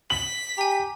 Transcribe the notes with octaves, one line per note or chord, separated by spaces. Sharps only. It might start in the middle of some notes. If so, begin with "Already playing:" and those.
B6 F#7
G4 G#5 A#5